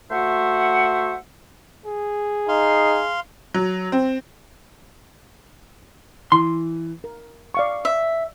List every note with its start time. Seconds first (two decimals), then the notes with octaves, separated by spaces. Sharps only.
0.11 A3 F#4 C5 E5 F#5
1.86 G#4
2.48 D#4 F5 C6
3.54 F#3
3.92 C4
6.32 E3 C6
7.04 A#4
7.54 D5 F5 C#6
7.85 E5